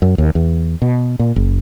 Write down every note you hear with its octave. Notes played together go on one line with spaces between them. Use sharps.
F#2
D#2
E2
B2
A#2
F#1